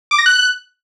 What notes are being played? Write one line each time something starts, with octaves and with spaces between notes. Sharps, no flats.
D6
A#6
F#6